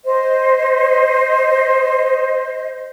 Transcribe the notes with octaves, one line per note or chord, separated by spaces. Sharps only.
C5 D#5